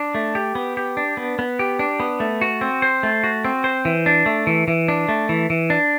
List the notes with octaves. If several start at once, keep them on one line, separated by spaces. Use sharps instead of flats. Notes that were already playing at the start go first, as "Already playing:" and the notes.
Already playing: D4
A3
G4
B3
G4
D4
B3
B3
G4
D4
B3
A3
F#4
C4
C5
A3
F#4
C4
C5
E3
D4
A3
E3
E3
D4
A3
E3
E3
D4